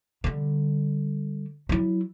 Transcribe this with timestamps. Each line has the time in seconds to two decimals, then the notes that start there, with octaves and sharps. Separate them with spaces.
0.24 D3 G3
1.69 F#3 E4